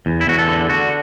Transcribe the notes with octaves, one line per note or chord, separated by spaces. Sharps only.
E2
E4
E2 F#4
A4
D3
D3 F#4